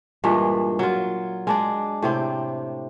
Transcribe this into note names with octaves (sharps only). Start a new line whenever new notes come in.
G2 A#2 E3 G#3
F#3 F4
G#3 D4 D5
A2 C3 C4